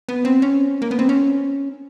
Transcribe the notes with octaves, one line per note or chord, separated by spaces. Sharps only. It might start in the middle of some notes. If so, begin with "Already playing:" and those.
B3
C4
C#4
A#3
B3
C4
C#4